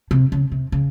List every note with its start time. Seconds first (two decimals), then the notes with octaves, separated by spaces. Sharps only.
0.11 C3
0.32 C#3
0.52 C3
0.72 C#3